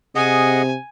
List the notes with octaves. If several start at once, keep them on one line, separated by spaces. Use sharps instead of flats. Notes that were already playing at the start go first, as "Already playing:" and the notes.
C3 G#4 D#5 F#5 G#5